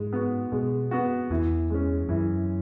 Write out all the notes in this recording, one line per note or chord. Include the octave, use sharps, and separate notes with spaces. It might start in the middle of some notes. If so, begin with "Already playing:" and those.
Already playing: G#2 G#3
B3 F#4
B2 G#3
B3 F#4
E2 E3
G#3 C#4
F#2 E3